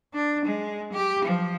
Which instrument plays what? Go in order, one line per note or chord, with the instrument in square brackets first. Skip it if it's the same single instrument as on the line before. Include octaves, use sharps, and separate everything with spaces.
[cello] D4
G#3
G4
F3